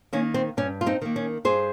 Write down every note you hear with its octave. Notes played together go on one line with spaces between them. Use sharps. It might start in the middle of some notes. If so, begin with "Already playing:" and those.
D#3 A#3 C#4
C4
G2 C#4
F4
C4 D#4
D#3 A#3
C#4
G2 G#4 C5